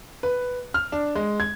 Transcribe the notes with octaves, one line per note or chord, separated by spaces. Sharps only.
B4
F6
D4
G#3
G#6